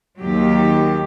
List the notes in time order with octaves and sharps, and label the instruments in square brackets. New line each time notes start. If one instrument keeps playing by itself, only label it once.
[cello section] D#2 D#3 F#3 G4